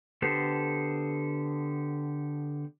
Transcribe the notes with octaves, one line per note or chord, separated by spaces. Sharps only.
D3 B3 G4 A4 C5